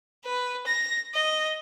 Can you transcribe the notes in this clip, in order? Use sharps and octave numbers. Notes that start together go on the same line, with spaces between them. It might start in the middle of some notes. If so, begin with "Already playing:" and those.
B4
A#6
D#5